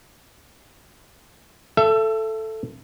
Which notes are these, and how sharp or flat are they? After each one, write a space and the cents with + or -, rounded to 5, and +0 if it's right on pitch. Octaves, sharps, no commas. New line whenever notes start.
A4 +0 E5 +30